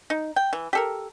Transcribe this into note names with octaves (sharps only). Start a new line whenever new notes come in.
D#4
G5
E3
G4 A4 A#4